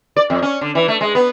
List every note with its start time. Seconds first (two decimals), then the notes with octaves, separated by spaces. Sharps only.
0.17 D5
0.30 F2
0.42 C#4
0.61 D3
0.75 E3
0.88 A3
1.01 G#3
1.15 B3